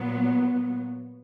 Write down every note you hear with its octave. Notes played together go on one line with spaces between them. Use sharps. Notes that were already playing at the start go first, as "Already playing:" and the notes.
Already playing: A#2 F#3 B3